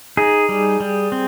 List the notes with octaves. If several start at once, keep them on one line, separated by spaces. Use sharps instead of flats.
D#4 G#4
G3
G3
C4